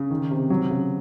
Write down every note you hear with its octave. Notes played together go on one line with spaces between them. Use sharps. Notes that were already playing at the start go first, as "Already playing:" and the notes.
Already playing: C#3
D#3
C3
F#3
C#3